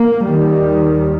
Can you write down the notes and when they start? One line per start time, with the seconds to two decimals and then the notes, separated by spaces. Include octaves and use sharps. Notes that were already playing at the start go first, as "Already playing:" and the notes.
Already playing: A#3
0.25 D#2 D#3 G3